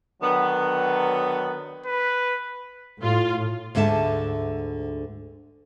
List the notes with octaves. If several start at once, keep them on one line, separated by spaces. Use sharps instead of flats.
D3 D#3 F#3 B3
B4
A2 F4
D2 G#2 D3 E5 A5